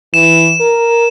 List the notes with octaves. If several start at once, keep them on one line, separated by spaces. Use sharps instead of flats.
E3 E7
A#4